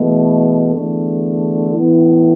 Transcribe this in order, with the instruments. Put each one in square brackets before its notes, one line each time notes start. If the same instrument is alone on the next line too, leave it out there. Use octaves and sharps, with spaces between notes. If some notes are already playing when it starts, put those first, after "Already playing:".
Already playing: [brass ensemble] E2 B2 A3
E2 D3 A3
A2 E3 B3 E4